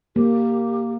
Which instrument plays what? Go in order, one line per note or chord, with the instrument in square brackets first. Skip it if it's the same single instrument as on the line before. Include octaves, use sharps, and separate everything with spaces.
[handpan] A#3 [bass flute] G4